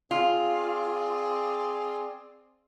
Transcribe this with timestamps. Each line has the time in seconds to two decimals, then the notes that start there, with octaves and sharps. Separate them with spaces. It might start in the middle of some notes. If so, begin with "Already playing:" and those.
0.11 C4 F4 G#4 D5